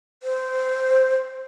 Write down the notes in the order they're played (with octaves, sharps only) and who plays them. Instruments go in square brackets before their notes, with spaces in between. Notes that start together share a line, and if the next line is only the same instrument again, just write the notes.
[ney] C5